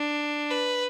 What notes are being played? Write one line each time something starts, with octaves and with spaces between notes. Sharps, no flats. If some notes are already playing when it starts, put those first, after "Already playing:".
Already playing: D4
B4